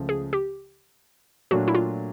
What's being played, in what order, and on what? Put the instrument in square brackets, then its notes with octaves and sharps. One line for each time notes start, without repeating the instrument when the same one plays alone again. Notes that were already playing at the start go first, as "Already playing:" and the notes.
Already playing: [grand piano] C#2 C#3 F3 A3
[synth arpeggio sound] G#4
G4
[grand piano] A#2 F#3 A3 D4 [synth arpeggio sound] F#4
[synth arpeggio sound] E4
F4